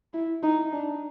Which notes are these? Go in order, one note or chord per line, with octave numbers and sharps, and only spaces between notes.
E4
D#4
D4